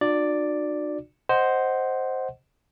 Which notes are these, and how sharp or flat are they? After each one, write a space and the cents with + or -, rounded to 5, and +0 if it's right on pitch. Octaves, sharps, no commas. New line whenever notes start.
D4 +45 F#4 -40 D5 +0
C5 +0 D#5 +0 F#5 +10